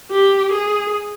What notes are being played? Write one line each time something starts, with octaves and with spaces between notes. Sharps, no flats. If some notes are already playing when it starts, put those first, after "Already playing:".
G4
G#4